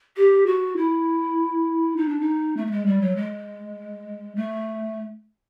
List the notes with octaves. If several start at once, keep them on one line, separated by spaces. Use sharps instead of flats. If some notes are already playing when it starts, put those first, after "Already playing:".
G4
F#4
E4
D#4
D4
D#4
A3
A3
G#3
G3
F#3
G#3
A3